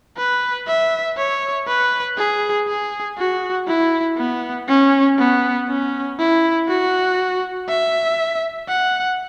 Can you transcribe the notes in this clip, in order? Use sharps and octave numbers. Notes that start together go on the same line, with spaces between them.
B4
E5
C#5
B4
G#4
G#4
F#4
E4
B3
C#4
B3
C#4
E4
F#4
E5
F#5